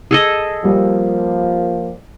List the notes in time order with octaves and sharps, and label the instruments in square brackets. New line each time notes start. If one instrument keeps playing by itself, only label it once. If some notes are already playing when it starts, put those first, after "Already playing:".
[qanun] G#4 A4 D#5
[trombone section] F3 A#3 [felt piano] G3